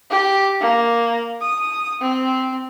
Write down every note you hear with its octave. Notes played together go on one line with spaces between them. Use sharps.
G4
A#3
D#6
C4